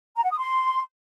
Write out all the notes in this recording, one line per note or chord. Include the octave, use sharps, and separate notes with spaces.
A#5
F#5
D#6
C6